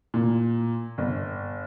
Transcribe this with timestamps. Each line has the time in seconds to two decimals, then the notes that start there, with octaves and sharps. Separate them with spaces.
0.14 A#2
0.98 G1